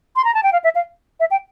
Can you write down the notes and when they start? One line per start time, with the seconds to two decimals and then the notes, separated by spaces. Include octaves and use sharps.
0.16 C6
0.25 A#5
0.34 A5
0.43 G5
0.53 F5
0.64 E5
0.75 F5
1.20 E5
1.31 G5